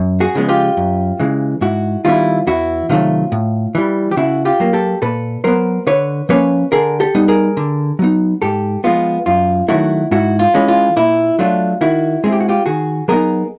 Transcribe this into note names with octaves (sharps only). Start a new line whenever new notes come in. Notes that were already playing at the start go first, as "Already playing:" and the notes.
Already playing: F#2
F#4 G#4
C#3 F3 G#3 B3
F4 G4
F#2
C#3 E3 G#3
G#2 E4 F#4
D#3 G3 B3 E4 F4
E2 E4 F#4
C3 D#3 F#3 A3 F4
A2
E3 G3
G4
C#3 E4 F#4
F4 G4
F#3 A#3
G4 A4
A#2 A4 B4
F#3 B3 A#4 C5
D3 B4 C#5
F3 A#3 C#4 B4 C#5
D3 G#4 A#4
G4 A4
G3 B3 D#4
G#4 A#4
D3
F#3 B3 D#4
G#2 G4 A4
F3 G#3 B3 F4
F#2 F4
D#3 F#3 A3 E4 F#4
G#2 E4 F#4
F4
E3 G#3 C#4
F4
A#2 E4
F#3 A3 D4 F4
D#3 E4 F#4
G#3 C4 E4 G#4
G4
F#4
F4 G4
D#3 F#4 G#4
F#3 B3 D#4 G#4 A#4